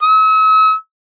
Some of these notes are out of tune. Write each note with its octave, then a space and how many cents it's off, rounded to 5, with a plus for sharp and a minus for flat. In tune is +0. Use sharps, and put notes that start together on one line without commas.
E6 -45